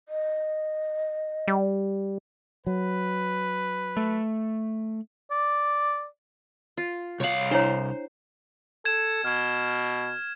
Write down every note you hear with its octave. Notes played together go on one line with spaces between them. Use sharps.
D#5
G3
F#3 B4
A3
D5
F4
C2 C#5 F5 F#5
D4 E4 C5 C#5
A4 G#6 E7
B2 F6 G#6